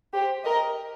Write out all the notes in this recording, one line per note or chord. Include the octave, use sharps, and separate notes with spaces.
G4 C5
A#4 D#5